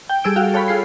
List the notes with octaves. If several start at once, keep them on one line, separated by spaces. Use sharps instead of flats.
G5
G3 G#4 A4 E6 D7
F#4 F5 G5
A4 C#5 F5 G5 B5
F4 G#4 C7